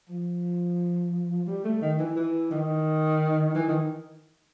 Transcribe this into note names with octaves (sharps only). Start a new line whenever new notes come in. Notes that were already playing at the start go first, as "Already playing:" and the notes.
F3
G3
A3
D#3
E3
E3
D#3
E3
D#3